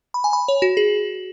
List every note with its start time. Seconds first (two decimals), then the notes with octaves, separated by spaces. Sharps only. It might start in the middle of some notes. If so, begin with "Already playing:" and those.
0.14 B5
0.24 G#5
0.33 B5
0.48 C#5
0.62 F#4
0.77 G#4